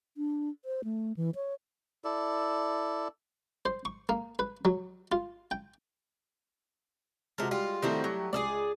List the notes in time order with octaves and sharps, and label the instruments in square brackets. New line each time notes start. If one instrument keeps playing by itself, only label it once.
[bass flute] D4
C5
A3
E3
C#5
[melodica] E4 A4 D5
[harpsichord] C5
C#6
A#3
B4
F#3
F4
G5
[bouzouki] C3 A#4 [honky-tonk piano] G#3 F#4 [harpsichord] A5
[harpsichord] G3 [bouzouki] F4
[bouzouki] D#3 C4 F#4 [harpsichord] G3 [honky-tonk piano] A3 E4 G4
[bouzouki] F#3
[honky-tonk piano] C#2 [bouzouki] G#4 A4 D5